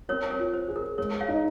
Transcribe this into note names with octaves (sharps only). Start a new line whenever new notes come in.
C4 A#4 C#5
A#4 C#5
F4
C5
G#4
A#4
G#3 A#4 C#5
C#5 F5
D#4